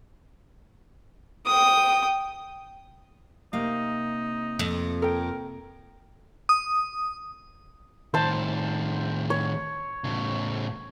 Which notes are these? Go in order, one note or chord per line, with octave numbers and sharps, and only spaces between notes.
G5 D#6
C3 A#3 D#4 F5
F2
A4 A#4 G5
D#6
A2 D#3 C5 A5
C#5
A2 C#3